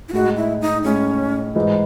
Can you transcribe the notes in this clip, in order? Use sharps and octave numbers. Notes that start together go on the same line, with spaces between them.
E4
A2 G#3 D#4 F#4
E4
D#4
A2 G#3 C#4 D#4
G#2 E3 G#3 D#4